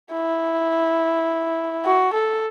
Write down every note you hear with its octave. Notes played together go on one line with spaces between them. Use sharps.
E4
F#4
A4